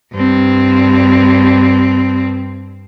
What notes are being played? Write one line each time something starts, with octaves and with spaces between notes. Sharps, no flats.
G2 C4